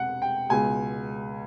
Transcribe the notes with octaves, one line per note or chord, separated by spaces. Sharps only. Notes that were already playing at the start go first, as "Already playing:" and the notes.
Already playing: E1 C3 F#5
G5
C#2 B2 G#3 G#5